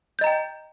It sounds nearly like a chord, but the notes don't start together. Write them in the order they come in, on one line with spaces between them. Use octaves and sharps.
G6 D#5 A#5 G5